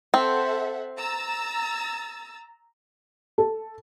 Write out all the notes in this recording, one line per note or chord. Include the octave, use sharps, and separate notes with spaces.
C4 A4 E5 F#5
A#5 E6 A6
A4